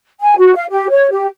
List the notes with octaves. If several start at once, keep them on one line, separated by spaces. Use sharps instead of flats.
G#5
F#4
F5
G4
C#5
G4